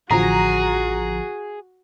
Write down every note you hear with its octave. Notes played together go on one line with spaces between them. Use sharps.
A1 D3 F3 F#4 G#4 A#5